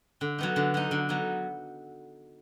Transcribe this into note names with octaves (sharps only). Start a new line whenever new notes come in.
D3
F#3 B3 D#4
D3
F#3 B3 D#4
D3
F#3 B3 D#4